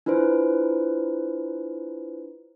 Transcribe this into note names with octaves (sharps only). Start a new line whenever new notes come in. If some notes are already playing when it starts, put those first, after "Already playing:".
D4 E4 F4 B4 C5